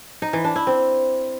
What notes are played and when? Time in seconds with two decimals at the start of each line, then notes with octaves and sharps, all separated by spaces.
0.22 D#4
0.33 E3
0.44 D4
0.56 E4
0.67 C4